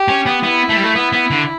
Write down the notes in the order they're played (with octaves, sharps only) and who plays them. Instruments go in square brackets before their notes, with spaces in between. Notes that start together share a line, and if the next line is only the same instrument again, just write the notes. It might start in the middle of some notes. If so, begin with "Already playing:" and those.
Already playing: [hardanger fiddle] G4
[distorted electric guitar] C#4
B3
[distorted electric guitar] B3 [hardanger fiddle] E4
[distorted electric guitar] A3
G3
A3
B3
B3
D3